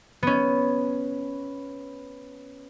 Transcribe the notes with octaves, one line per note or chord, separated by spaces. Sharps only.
B3 C#4